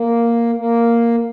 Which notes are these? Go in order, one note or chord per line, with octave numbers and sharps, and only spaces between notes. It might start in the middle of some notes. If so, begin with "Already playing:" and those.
Already playing: A#3
A#3